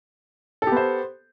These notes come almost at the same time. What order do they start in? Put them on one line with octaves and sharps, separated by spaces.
A4 G4 B3 C5